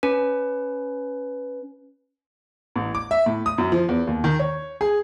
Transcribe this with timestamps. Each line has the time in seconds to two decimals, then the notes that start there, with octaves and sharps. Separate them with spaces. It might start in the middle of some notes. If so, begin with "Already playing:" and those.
0.03 C#4 B4
2.76 A1
2.95 D6
3.11 E5
3.26 A2
3.46 D#6
3.58 F#2
3.72 F3
3.89 E2
4.07 D#2
4.24 D#3
4.40 C#5
4.81 G#4